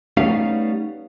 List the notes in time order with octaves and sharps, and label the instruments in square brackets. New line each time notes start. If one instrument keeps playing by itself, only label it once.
[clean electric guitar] G3 A3 B3 C#4 D#4 F5